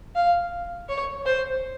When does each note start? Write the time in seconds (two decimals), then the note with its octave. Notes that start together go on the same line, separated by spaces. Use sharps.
0.15 F5
0.89 C#5
1.26 C5